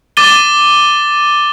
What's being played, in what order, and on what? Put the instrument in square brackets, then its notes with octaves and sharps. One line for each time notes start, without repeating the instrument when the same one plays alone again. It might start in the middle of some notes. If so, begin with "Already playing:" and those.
[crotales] D6 A6 D#7 G7